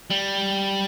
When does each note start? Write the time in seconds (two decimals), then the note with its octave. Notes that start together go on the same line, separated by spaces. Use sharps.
0.10 G3